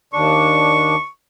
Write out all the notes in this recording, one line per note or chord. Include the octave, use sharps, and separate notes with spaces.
D#2 D4 C#6